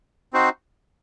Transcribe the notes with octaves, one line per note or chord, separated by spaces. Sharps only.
C4 D#4 F#4 C5